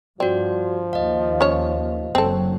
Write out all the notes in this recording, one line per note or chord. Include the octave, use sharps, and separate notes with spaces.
G2 F3 C4 F#4 D5
D#2 D#5 F5
C#4 C#5
F#1 F#3 C4 A4